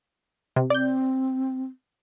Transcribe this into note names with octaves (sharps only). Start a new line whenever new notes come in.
C3
C4 D5 G6